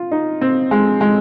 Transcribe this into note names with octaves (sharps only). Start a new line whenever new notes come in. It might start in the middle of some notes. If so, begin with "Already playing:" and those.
Already playing: F4
D#4
C4
G#3
G#3